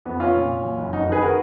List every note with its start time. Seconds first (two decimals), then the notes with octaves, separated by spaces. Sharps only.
0.05 F2 B3
0.20 F2 C#4 F4
0.35 A#2
0.49 A#2
0.64 F#2
0.78 F#1
0.93 F2 D#4 F#4
1.07 D#3 G#4 B4
1.22 F#4 A#4